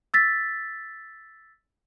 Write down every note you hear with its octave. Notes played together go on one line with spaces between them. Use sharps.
E6 A6 B6